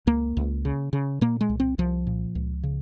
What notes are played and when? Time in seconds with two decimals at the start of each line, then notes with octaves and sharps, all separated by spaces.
0.07 C#2 A#3
0.37 C#2
0.65 C#3
0.93 C#3
1.21 A#2 A#3
1.41 G#3
1.49 C2
1.60 C4
1.78 C2 F3
2.07 A#2
2.35 C#2
2.63 C#3